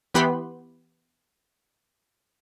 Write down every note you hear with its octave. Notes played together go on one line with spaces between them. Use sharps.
E3 B3 G4 B4 B5 C6